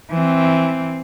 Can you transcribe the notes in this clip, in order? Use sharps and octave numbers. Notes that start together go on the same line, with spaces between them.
E3 C4